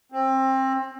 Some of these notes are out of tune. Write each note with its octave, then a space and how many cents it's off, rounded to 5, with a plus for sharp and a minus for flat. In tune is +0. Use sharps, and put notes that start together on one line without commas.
C4 +25